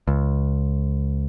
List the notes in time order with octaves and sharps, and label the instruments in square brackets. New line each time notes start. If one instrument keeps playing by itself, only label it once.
[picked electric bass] C#2